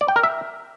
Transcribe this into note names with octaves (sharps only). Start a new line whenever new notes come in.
D5
G5
A#4
E5